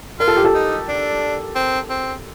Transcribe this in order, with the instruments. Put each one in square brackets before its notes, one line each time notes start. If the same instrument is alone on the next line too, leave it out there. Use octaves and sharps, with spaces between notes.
[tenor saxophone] F4 [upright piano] A#4
[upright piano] A4
G4
A4
[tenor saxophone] D#4
D4
C4
C4